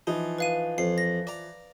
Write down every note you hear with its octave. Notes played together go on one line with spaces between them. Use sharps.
E3 F3 D#4
B4 F5 D#7
F2 C7
A#6
D5 A#5